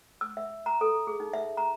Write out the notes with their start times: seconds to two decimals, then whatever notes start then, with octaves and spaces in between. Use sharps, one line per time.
0.21 E6
0.37 E5
0.66 A#5
0.81 A4
1.07 G#4
1.20 D#4
1.33 E5
1.57 A#5